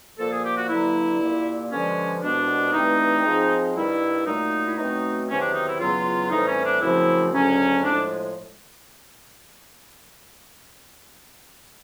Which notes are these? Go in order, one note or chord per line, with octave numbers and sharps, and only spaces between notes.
A#2 F3 A#3 A4
G#4
G4
F#4
G2 D3 F#3 A#3 E4
A#2 G3 A#3
G2 D3 F3 G#3 C#4
C2 B2 G#3 B3 D4
G2 E3 A3 C4 D#4
G#2 F3 G#3 C4
G2 D#3 G3 E4
A#2 F#3 A3 D#4
E4
B2 F#3 A3 C4 D#4
E2 C3 D#3 F#3 C#4
D4
D#4
E4
E2 C#3 F#3 B3 F4
A2 E3 G3 C4 D#4
C#4
D4
F#2 C#3 F3 A3 C4 E4
D2 C#3 F#3 C#4
A2 F3 G#3 D4